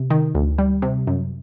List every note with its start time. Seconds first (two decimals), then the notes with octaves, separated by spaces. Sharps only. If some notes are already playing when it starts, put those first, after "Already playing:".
Already playing: C3
0.10 D#3
0.35 D2
0.58 G3
0.82 C3
1.07 F#2